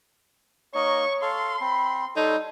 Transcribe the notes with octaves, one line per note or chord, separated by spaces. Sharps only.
A#3 D#4 C#5 D#5 C#6
A4 F5 C6
C4 B5
G3 D#4 A4 C#5 C6